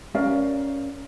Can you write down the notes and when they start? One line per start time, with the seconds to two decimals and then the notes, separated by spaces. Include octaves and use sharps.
0.14 C#4 A#4 D5 F5